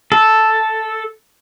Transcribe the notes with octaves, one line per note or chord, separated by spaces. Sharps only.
A4